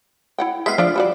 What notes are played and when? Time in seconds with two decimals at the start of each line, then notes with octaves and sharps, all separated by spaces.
0.38 E4 F#5 G5
0.66 G#3 B3 E5 F5
0.78 F3 D4 F4 D5
0.96 G3 F#4 D5